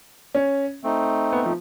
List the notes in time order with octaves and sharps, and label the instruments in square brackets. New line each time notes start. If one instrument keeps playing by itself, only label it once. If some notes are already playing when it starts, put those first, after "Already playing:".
[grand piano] C#4
[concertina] A3 C4 D#4
[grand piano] B3
F3